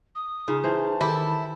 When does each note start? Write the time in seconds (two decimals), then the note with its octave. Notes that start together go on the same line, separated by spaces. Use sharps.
0.15 D#6
0.48 C#3 D#4 F4
0.64 E3 C5 A5
1.01 D#3 E4 G4 A4